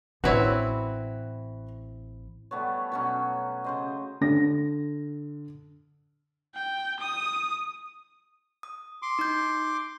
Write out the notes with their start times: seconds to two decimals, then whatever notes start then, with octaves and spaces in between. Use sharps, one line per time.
0.24 A1 C4 E4 F#4 B4 C#5
2.51 G3 A3 B3 C#5
2.92 B2 F#3 C#4
3.64 C#3 C5 D#5
4.21 D3 A#6
6.55 G5
7.00 D#6
8.63 D#6
9.02 C6 D6
9.19 D#4 G6